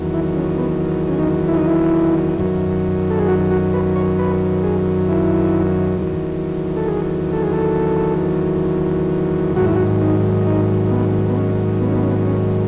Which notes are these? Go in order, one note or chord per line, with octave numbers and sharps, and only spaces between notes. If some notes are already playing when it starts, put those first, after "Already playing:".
Already playing: E2 D#3 F#3
E4
C#4
B3
C#4
D#4
E4
D#4
E4
F#2 D#3 F#3
A4
G#4
F#4
F#4
B4
C#5
B4
G#4
E4
E2 D#3 F#3
A4
G#4
A4
G#4
A4
G#2 D#3 F#3 F#4
E4
F#4
D#4
D#4
B3
B3
C#4
B3
C#4
B3
C#4
B3
C#4